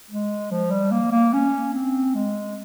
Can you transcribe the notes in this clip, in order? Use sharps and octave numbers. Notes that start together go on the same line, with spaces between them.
G#3
F3
G3
A#3
A#3
C#4
C4
G#3